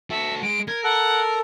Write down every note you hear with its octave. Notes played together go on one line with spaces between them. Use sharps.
F#4 A4 E5
G#3 D7
A#4 G#6
A4 F#5